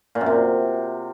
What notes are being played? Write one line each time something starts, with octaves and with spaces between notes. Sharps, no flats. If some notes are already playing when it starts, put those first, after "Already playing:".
A#2
F#2
C3